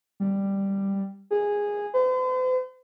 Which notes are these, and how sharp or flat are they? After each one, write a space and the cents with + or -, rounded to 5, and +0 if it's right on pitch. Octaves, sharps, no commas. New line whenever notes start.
G3 +5
G#4 -10
C5 -45